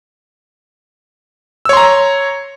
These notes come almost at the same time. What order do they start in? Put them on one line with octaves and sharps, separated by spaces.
E6 C#5 C6 A#5